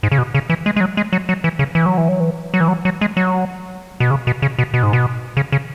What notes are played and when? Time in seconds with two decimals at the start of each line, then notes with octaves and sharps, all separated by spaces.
0.03 G#2
0.12 C#3
0.18 B2
0.34 C#3
0.50 E3
0.66 G#3
0.76 G#3
0.81 F#3
0.97 G#3
1.13 F#3
1.29 F#3
1.44 E3
1.59 C#3
1.75 E3
1.86 F#3
1.97 E3
2.09 F#3
2.20 E3
2.54 F#3
2.61 E3
2.68 F#3
2.85 F#3
3.01 G#3
3.17 F#3
4.00 B2
4.11 C#3
4.27 B2
4.42 C#3
4.59 B2
4.74 B2
4.83 G#2
4.93 B2
5.37 C#3
5.52 C#3